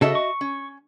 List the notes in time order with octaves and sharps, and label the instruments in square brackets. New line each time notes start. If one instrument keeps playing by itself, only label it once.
[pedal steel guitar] C#3 A4 [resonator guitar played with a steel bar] F#4 D#5 E5
[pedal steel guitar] C#6
[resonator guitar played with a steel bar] C#4